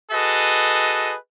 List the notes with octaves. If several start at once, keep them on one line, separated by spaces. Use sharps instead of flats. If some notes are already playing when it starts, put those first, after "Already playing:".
F#4 G#4 A4 B4 D#5